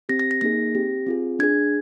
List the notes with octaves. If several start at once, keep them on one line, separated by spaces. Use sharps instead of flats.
C4 G4 A#6
A#6
A#6
A#3 D#4 G#4 A#6
C4 G4
C4 F4 G#4
D4 G#4 G#6